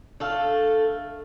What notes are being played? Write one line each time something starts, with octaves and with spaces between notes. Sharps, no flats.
A3 D4 A4 F5 F6